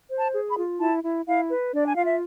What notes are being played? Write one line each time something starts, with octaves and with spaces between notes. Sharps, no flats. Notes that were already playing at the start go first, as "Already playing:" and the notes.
C5
A5
G#4
B5
F4
E4 A5
E4
E4 F5
B4
D4 D5
G#5
F4 F5
E5